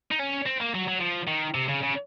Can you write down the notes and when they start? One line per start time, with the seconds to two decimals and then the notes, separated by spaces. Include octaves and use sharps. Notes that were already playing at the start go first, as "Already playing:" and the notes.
0.11 D#4
0.19 C#4
0.46 C4
0.61 A#3
0.74 F#3
0.88 F#3
1.00 F3
1.28 D#3
1.55 C3
1.69 C#3
1.83 C#3